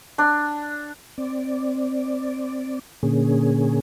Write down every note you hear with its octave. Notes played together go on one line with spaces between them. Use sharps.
D4
C4 D5
A#2 D3 A#3 C#4 G#4